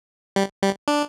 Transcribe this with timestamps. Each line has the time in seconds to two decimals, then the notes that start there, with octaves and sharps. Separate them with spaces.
0.36 G3
0.63 G3
0.88 D4